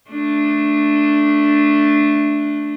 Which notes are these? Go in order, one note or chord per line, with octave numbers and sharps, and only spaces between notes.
A3 D4